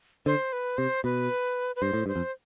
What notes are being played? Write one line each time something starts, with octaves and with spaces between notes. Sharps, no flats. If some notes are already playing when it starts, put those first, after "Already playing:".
D3 C5
B4
C3 C5
B2 B4
B4
G2 C5
A2
G2 C5
F2